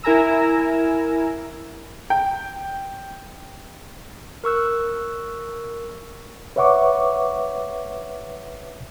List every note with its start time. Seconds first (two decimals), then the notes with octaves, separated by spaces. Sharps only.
0.04 E4 A#4 G#5 A#5 E6
2.10 G5
4.44 A#4 C#6 E6 F#6
6.56 B4 C#5 E5 F#5 C#6 D6